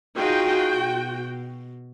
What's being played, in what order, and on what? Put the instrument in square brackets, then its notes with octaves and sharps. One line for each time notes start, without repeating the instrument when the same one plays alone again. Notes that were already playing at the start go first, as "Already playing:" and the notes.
[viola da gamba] D#4 F4 G#4 [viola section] F#4 G5
[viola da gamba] B2